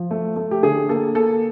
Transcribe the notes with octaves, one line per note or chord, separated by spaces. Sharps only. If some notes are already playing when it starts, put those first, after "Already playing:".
Already playing: F3
A3
A3
G4
D3 G#4
A#3 A4
A#3 A4